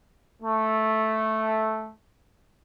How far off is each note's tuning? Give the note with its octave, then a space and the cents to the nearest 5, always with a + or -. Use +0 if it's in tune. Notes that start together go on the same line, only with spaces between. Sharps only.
A3 -5